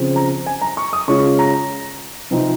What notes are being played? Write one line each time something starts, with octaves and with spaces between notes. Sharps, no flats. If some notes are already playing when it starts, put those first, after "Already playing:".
Already playing: C#3 F3 C4
A#5
G#5
A#5
C#6
D#6
C#3 G#3 C#4 F4 C#6
A#5
C3 F3 C4 D#4